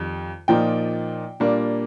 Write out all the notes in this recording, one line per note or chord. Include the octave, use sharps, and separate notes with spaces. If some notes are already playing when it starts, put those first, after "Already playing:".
Already playing: F2 D#3 G3
A#2 F3 A#3 D#4 G5
A#2 G3 A#3 D4